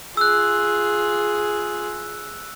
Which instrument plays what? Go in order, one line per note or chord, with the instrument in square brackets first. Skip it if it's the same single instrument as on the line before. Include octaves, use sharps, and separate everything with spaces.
[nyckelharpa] F4 G#4 [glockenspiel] E6 F#6